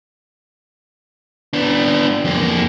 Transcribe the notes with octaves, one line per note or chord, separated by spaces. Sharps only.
B3 D4
F2 A#3